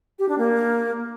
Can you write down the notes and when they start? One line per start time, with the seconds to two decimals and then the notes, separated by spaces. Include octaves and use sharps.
0.19 G4
0.29 D4
0.38 A#3